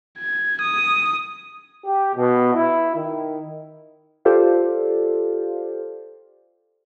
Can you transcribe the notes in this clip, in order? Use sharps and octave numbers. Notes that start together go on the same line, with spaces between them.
G#6
D#6
G4
B2
E4
D#3
F4 G4 A4 C5 D5 F5